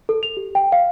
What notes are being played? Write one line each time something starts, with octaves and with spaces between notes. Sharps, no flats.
A4
F7
G4
G5
F5